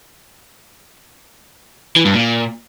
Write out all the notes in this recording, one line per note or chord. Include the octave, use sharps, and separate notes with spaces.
E3
G2
A#2